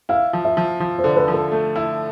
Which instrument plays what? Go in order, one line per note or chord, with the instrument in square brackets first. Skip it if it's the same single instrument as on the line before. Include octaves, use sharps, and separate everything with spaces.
[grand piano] E4 [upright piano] F5
[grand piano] F3
[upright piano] E5
[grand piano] F3
F3
[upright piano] C5
[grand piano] D3
[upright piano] B4
[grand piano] F3
[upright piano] A4
[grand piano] A3
E4